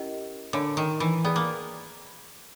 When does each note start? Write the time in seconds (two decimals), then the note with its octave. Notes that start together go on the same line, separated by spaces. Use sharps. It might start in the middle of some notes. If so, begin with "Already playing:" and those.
Already playing: C#4 E4 G4 A#4 D#5
0.53 D3 A#4 C#5 E5 G#5 B5
0.77 D#3
1.00 E3
1.24 B3 G#4 B4 D5 G5
1.36 A#3